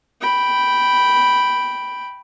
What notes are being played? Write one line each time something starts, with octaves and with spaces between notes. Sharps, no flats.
G5 B5